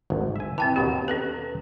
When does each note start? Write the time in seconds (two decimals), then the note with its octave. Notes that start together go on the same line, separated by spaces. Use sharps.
0.10 G#1 D2
0.36 E5 G#5
0.58 E3 C4 G5 A5
0.76 D#2 B2 D#4 G4
1.08 C#4 A4 B4